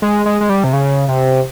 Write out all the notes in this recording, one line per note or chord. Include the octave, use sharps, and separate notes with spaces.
G#3
G#3
G#3
G3
C3
C#3
C3